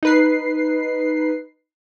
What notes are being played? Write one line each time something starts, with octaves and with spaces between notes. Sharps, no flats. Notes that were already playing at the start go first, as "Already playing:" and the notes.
D#4 B4 C7